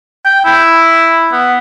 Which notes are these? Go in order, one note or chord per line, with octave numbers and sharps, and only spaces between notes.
G5
E4
B3